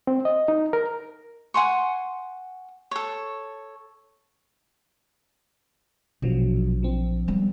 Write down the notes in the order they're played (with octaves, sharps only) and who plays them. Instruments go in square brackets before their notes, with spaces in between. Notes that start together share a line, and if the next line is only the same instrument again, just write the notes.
[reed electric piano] C4
D#5
D#4
A#4
[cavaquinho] F#5 G#5 C6 C#6
A4 C#5
[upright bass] A#1 [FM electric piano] B2 F3 F#3
[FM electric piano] F3 C4
[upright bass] G3 B3